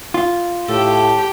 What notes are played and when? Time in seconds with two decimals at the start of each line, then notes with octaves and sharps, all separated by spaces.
0.14 F4
0.68 A2 G4 A4